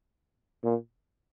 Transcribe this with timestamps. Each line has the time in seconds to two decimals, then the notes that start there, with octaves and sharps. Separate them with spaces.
0.64 A#2